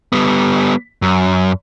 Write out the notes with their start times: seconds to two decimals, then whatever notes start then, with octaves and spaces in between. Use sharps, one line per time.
0.12 G3 B3
1.02 F#2